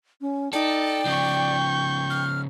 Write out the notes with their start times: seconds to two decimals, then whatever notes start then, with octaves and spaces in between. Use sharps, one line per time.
0.21 C#4
0.53 D#4 A4 D5 G5
1.05 C#3 F3 C#6 G6
2.10 F6